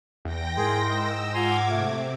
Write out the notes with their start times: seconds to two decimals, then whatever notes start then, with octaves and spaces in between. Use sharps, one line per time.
0.25 E2 G5 A#6
0.57 G#2 E4 G#4 A#4 C6
0.89 D#5 E6
1.34 F4 F#5 G#5 A#5 C6 D6 G#6
1.69 C3 A3